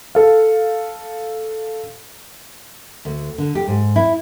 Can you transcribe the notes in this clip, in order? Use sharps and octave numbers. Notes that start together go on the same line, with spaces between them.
A4 F5
D2
D3
G4
G#2
E4